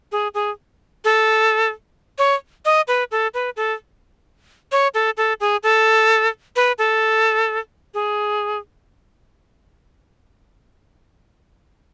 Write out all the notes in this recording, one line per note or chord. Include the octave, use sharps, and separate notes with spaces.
G#4
G#4
A4
C#5
D#5
B4
A4
B4
A4
C#5
A4
A4
G#4
A4
B4
A4
G#4